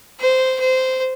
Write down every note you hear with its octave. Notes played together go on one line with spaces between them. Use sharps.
C5
C5